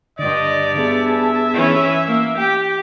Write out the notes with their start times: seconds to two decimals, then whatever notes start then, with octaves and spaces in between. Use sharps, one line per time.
0.19 G2 D3 D5 D#5
0.78 B3 G#4 E5 A5
1.53 E3 C#4
2.06 A#3
2.38 G4 G5